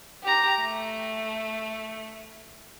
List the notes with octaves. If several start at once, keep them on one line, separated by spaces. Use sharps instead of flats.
G4 A#5
A3